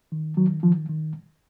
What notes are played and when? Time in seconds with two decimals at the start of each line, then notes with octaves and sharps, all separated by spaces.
0.12 D#3
0.37 D#3 F#3
0.63 D#3 F3
0.89 D#3